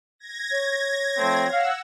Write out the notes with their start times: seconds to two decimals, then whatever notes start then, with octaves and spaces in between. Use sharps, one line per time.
0.19 G#6 A#6
0.51 C#5
1.18 F3 A3 C4
1.50 F5 F#5 E6